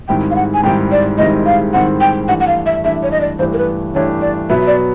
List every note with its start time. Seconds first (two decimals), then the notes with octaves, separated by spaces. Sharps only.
0.08 G#2 D#3 G3 C4 E4 G5
0.31 F5
0.36 F#5
0.54 G#5
0.63 G#2 D#3 G3 C4 E4 G5
0.92 D5
1.18 G#2 D#3 G3 C4 E4 D#5
1.46 F5
1.73 G#2 D#3 G3 C4 E4 F#5
2.01 G5
2.28 G2 E3 A3 D4 G4 F#5
2.40 F#5
2.48 F5
2.66 E5
2.84 G2 E3 A3 D4 G4 E5
3.03 C#5
3.12 D#5
3.21 D5
3.39 G2 E3 A3 D4 G4 C5
3.53 A#4
3.58 B4
3.94 G2 E3 A3 D4 G4 C#5
4.21 D5
4.50 B2 F#3 B3 E5
4.67 D5